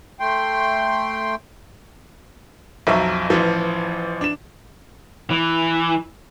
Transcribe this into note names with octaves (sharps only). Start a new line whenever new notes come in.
A3 G5 C6
B1 F2 F3 F#3 E5 C#6
A1 E3 F3
D4 E7
E3